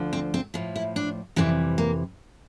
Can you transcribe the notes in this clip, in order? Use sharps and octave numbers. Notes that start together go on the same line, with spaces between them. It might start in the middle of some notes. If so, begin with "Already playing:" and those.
Already playing: D2 D3 F3
C4
C4
A2 F3
E4
D4
F2 C3 E3 G3 C4
A#3